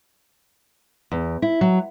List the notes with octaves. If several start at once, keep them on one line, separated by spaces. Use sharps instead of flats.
E2
E4
F#3